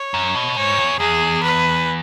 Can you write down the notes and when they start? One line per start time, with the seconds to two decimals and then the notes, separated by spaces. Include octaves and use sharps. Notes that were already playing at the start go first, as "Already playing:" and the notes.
Already playing: C#5
0.14 F#2
0.35 B2
0.56 G#2 C#5
0.78 E2
1.00 E2 G#4
1.43 B4